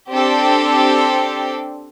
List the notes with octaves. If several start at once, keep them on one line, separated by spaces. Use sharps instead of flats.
C4 D4 G4 A4